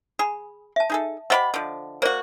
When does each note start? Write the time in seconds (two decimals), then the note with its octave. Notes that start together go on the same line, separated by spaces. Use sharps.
0.19 G#4 B5
0.76 E5 A5
0.90 D#4 G#4 A4
1.30 A3 G4 C5 D#5 F#5 B5
1.54 D3 F3
2.02 A#3 F#4 A#4 C5 D5